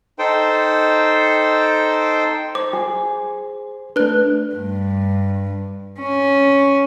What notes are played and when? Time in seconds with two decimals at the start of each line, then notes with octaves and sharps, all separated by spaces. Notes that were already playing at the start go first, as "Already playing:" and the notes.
0.19 D#4 A4 C5 G5
2.55 C5 D6
2.73 G#4
3.96 A3 D4 B4 F#6
4.55 G2
6.00 C#4